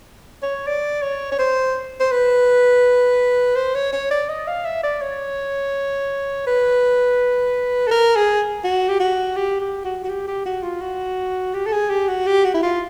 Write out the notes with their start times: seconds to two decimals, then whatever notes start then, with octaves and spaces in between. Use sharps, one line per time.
0.42 C#5
0.67 D5
1.02 C#5
1.32 C#5
1.39 C5
2.00 C5
2.11 B4
3.56 C5
3.75 C#5
3.92 C#5
4.11 D5
4.29 D#5
4.47 F5
4.65 E5
4.83 D5
5.01 C#5
6.47 B4
7.87 A4
7.91 A#4
8.15 G#4
8.64 F#4
8.88 G4
9.00 F#4
9.36 G4
9.60 G4
9.85 F#4
10.04 F#4
10.09 G4
10.27 G4
10.45 F#4
10.63 F4
10.81 F#4
11.54 G4
11.66 A4
11.72 G#4
11.90 G4
12.08 F#4
12.27 G4
12.44 F#4
12.54 E4
12.63 F4